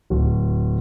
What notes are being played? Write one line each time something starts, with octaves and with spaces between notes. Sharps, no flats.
D1